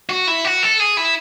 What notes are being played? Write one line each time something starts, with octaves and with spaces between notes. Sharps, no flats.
F#4
E4
F#4
A4
G#4
E4